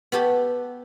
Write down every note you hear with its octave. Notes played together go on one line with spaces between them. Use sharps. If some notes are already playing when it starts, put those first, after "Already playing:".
B3 F#4 G4 A4